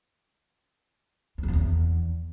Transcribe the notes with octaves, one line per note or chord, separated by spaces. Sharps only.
F2
E2
F#2
E2